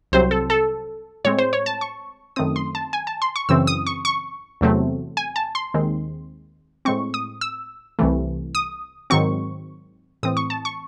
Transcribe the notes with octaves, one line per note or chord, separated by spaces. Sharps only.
C2 C3 F#3 C4 C5
A4
A4
A2 G#3 C4 C#5
C5
C#5
A5
C#6
F#2 D#3 A3 C4 D#6
C6
A5
G#5
A5
C6
C#6
F#2 C#3 E3 C4 E6
D#6
C#6
C#6
E2 C3 F#3 A3 C4
G#5
A5
C6
D#2 D#3 G#3 C4
A2 G#3 C4 C#6
D#6
E6
C2 C3 E3 A3
D#6
G#2 D#3 F#3 C4 C#6
A2 E3 C4 D#6
C#6
A5
C#6